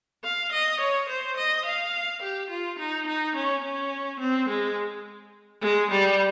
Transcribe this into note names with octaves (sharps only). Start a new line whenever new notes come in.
F5
D#5
C#5
C5
D#5
F5
G4
F4
D#4
D#4
C#4
C#4
C4
G#3
G#3
G3